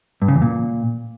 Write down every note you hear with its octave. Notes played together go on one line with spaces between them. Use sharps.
G2
C#3
E2
A#2